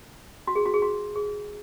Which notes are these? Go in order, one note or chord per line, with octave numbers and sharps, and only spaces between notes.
F#4
G#4
F#4
G#4
F#4
G#4